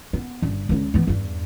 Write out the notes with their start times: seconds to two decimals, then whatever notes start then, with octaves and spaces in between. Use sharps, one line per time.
0.13 B3
0.42 G1 D3
0.69 C#2 D3
0.94 E3 B3
1.07 E2 G2